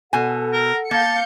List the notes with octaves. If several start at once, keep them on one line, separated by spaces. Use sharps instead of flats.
B2 A4 F#5 G#5
A#4
A#3 F5 A5 G6 C#7